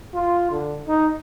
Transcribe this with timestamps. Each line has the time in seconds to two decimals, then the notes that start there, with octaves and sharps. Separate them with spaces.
0.13 F4
0.51 D3
0.87 D#4